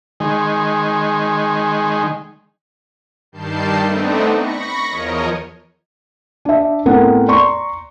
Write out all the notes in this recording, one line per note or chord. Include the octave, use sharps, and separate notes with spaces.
D#3 G#3
G2 D#3 G3 A5 G6 C7
A3 B3 C4 D4 D#4
B5 C#6 A#6 C#7
E2 F3 A#4 C#5 D#5
D4 E5
A2 B3 C4 A#4 F#5
D5 A#5 C6 C#6